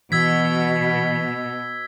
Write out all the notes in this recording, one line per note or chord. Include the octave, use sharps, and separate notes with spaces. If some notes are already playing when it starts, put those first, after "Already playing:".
B2 E3 E6 G#6 B6